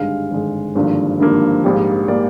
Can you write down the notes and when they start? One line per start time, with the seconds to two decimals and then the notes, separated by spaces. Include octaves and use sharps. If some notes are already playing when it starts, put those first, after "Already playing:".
Already playing: G#1 G2 D3 G#3 F5
0.31 G#1 G2 D3 G#3
0.75 G#1 G2 D3 F3 A#3
1.19 G#1 G2 D3 F3 A#3
1.64 A#1 G#2 G3 A#3
2.08 G3 A#3 D5